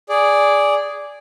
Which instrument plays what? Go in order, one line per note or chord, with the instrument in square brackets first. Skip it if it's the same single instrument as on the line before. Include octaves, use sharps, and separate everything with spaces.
[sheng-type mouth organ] G#4 D5